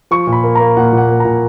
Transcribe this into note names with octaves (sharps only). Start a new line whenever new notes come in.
F3 C#6
A#2
B5
A#3
A#3 A#5
A#2 F#5
A#2
F#5
A#3
A#2 A#5